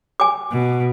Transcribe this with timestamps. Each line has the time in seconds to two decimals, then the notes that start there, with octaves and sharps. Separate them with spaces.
0.20 G#5 D6
0.52 B2